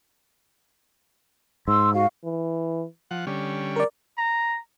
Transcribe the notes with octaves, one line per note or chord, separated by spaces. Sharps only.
G#2 C6 E6
F#4 F5
E3
F3 F#5
D3 G3 C#4
A#4 D5
A#5